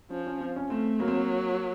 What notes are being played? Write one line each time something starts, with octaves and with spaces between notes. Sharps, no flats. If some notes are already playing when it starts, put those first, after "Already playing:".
F3 C#4
C#4
C4
C#4
A3 C4
F#3 A#3
C4
A#3